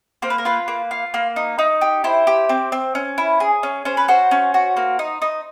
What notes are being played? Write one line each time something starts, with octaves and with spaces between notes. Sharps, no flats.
A#3 C5
B4
A#4
F4 B4
A#3
F4
A#3
D#4
D#4
G4
E4 C5
G4
C4
C4
C#4
E4
G#4
C#4
C#4 C5
B4
F#4 C5
C#4
F#4
A#3
D#4
D#4